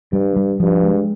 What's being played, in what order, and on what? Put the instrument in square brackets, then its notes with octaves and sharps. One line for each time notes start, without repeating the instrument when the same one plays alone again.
[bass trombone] G2 [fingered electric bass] G3
[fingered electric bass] G3
[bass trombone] G2 [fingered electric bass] F3
[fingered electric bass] G#3